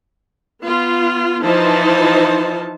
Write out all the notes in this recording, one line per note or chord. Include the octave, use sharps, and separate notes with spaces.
B3 F4
E3 F3 D#4 E4 C5 A5